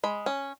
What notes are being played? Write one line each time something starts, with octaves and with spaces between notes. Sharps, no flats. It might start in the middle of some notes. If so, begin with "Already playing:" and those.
G#3 B5
C#4